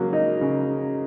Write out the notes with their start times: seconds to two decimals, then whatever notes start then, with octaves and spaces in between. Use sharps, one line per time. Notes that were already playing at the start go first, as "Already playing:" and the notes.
Already playing: C#3 F#3 A#3
0.13 D#4
0.41 C#3